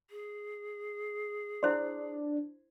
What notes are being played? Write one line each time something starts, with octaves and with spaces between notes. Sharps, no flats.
G#4
D4 E4 C5 D5 C6